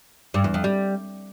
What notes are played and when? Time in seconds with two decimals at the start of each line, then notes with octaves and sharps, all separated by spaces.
0.34 G2
0.44 E2
0.54 F2
0.64 G3